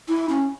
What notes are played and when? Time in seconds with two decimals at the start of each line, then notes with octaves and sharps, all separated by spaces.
0.09 E4
0.29 C#4